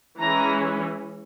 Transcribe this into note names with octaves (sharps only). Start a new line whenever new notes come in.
E3 G#3 C#4 E4 A#5